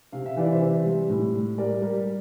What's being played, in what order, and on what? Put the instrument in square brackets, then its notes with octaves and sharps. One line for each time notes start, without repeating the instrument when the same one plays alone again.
[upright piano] C3 F5
E5
E3 D5
C5 E5
C3
G3
A2
G3
G3 A#4 D5
G3 G4 A#4